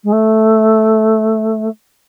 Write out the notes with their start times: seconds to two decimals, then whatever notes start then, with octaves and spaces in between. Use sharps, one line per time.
0.03 G#3
0.12 A3